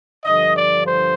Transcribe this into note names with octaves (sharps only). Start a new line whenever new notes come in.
G2 D3 F3 D#5
D5
C5